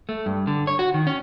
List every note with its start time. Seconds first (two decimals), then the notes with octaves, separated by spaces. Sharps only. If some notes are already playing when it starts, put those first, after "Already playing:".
0.09 A3
0.26 G2
0.47 D3
0.67 C#5
0.79 F#4
0.94 D#3
1.07 C#4